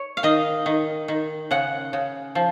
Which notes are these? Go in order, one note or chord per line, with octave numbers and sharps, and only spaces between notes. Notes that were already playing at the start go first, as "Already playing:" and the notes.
Already playing: C#5
F5
D#3 D#5
D#3
D#3
C#3 F#5
C#3
F3